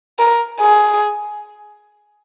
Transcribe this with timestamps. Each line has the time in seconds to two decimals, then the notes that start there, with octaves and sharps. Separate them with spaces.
0.19 A#4
0.61 G#4